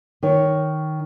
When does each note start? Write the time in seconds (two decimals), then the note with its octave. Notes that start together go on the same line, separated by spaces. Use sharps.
0.23 D#3 C#5